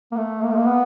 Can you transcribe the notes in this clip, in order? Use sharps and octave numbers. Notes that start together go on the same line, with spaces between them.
A#3
A3
A#3
A3
A#3
B3